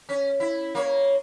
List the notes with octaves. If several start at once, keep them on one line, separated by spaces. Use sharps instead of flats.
C#4
E4
A#3 C#5